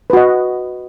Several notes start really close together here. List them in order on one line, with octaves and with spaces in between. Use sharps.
B4 F#4 D#5